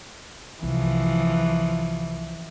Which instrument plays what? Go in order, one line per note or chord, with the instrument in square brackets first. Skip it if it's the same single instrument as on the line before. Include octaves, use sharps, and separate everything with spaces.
[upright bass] C2 [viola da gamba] E3 F3